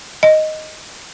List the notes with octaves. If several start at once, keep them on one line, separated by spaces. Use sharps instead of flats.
D#5